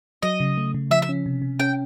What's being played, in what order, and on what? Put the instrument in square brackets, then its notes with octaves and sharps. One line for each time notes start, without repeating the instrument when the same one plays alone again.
[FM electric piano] F#3 [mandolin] D#5
[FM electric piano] C#3
A3
C#3
[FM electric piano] F3 [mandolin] E5
[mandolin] E5
[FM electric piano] C#4
C3
C3
[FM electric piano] C#4 [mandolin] G5